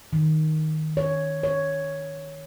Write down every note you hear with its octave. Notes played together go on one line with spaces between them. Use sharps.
D#3
C#5
C#5